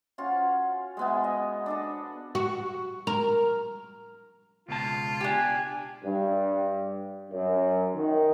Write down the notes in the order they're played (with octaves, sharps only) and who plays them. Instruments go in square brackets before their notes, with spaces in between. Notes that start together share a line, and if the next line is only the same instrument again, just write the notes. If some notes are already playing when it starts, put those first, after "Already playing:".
[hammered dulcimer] C#4 F4 F#4
G#3 B3 E4
D#5
D4 A4 D#5
[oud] F#4
A#4
[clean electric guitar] C#2 B2 A5 [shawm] F4
[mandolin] D4 G4 [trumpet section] G#5
[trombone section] G2
F#2
D#3